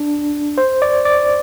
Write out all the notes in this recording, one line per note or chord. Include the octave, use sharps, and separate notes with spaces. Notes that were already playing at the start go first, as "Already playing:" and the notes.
Already playing: D4
C5
D5
D5